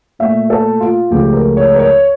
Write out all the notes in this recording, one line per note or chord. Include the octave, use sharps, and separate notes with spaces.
A#2 A3 E5
A4
F4
C#2 C#3 F3 A3 G4
A#4
C#5
A#4
C#5